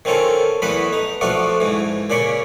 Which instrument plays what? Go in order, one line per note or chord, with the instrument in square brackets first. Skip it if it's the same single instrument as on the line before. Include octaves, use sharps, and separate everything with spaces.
[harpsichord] D#3 C4 C#4 F4 A4
E2 E3 A3 B3 B4 B5
D#4
F3 A3 B3 D4 F4 F#4
G#2 E3
A#2 C#3 D5 B5 C#6